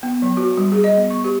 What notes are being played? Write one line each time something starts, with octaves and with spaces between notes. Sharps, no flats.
B3
F#3
F#4
G3
G#4
D#5
B3
C#6
G4